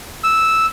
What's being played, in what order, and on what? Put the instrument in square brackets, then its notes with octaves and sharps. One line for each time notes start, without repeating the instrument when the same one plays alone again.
[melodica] E6